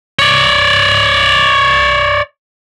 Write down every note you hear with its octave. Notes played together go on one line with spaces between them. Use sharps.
C#5 D5